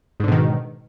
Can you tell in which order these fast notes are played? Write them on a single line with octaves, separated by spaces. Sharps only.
G#2 D3 B2 D#3